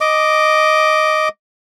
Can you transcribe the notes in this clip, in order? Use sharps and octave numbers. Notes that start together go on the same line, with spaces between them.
D#5 D6